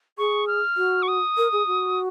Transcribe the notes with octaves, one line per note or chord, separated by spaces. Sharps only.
G#4 C#6
F6
F#4
C#6
D#6
A#4
G#4
F#4